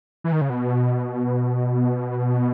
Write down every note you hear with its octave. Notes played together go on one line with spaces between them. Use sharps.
E3
D#3
C#3
B2